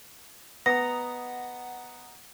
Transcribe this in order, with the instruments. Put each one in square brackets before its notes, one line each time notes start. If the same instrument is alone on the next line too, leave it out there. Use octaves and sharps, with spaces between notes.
[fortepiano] B3 [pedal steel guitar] D#5 A#5 [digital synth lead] F#5 [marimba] A#6